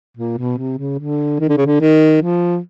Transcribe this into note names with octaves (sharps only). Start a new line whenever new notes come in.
A#2
B2
C3
C#3
D3
D#3
D3
C#3
D3
D#3
F3